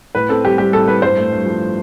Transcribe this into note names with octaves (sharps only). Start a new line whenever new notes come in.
A2 B4
C4 A4
G3 G4
G3 G4
A2 A4
A2 B4
G2 C5
A3
G2
F3